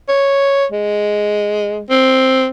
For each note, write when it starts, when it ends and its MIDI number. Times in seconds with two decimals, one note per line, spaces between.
0.09 0.65 73
0.72 1.80 56
1.90 2.48 60